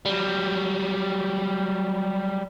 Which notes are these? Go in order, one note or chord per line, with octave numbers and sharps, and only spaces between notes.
F#3 G3